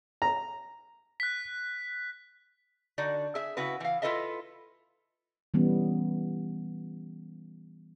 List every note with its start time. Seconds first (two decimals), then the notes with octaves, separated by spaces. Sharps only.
0.22 A#5
1.20 F#6 B6
2.98 D3 D#4 F#4 D5
3.35 G#4 E5
3.57 C#3 E4 F#4 B4
3.80 E3 F5
4.02 E4 F4 A4 B4 D#5 E5
5.54 E3 G3 B3 C#4